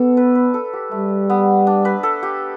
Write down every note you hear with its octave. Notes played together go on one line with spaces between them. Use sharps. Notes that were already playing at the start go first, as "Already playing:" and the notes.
Already playing: B3 D4 A4
B4
B4
A4
G4
G3 A3
B3
D4
B4
A4
G4